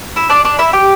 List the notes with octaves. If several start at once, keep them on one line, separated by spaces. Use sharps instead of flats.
E4 E5
D4 D5
D4 D5
E4 E5
G4 G5